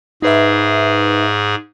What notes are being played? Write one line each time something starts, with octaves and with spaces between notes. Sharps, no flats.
G#2 D#4 G#4 B4 E5